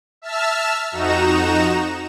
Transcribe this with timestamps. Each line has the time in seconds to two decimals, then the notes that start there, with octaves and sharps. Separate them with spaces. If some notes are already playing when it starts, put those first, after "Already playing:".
0.22 E5 A5 E6 F6
0.92 F2 D#4 F#4 A#5 E7